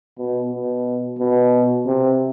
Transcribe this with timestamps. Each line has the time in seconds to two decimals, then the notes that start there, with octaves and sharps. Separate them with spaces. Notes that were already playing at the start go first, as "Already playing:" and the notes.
0.18 B2
0.52 B2
1.19 B2
1.86 C3